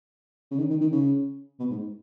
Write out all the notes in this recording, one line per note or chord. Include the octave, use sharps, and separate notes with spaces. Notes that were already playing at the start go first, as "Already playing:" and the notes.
C#3
D#3
D#3
D#3
C#3
B2
G#2